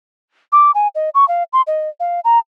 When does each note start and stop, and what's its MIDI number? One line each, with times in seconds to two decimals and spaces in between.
0.52 0.71 86
0.75 0.88 80
0.95 1.10 75
1.14 1.27 85
1.28 1.43 77
1.53 1.62 84
1.67 1.89 75
2.00 2.20 77
2.24 2.38 82